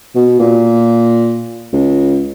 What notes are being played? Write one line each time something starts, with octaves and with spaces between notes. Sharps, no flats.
B2
A#2
C#2